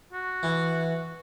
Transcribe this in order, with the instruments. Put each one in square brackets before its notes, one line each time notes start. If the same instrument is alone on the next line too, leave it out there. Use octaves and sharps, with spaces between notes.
[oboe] F#4
[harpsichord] E3